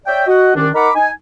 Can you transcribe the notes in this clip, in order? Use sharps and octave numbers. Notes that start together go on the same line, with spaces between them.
C#5 D5 E5 G5
F#4 D#5 F#5
C2 D#3 C#4 D4
D#4 A#4 F#5 A#5 B5 D6
D#4 G#5